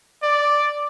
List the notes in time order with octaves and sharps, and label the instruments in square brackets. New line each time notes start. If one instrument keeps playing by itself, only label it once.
[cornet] D5